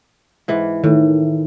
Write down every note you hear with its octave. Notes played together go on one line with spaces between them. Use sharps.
G#2 E3
A2 D#3